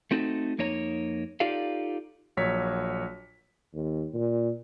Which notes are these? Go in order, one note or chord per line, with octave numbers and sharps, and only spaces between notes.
A3 C4 D#4 F#4 A4
F2 A#3 D#4 C#5 A5 A#5
D#4 F4 G4 A4 D5 F5
A#1 F#3 A#3 C#5 B6
D#2
A#2